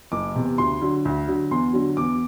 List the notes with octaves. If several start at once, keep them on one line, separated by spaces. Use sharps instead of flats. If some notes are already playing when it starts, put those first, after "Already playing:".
F#1 D6
E2 C3
D2 C6
D3 F#3
D2
D3 F#3
E2 C6
D3 F#3
E2 D6